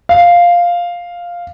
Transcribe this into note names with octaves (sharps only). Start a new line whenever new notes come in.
F5